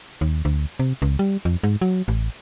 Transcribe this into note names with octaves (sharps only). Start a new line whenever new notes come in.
D#2
D2
C3
C#2
G3
F2
G#2
F#3
A1